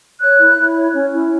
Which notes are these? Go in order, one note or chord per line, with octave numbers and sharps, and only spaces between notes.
C#5 F#6
E4
E4
C#5
C#4
E4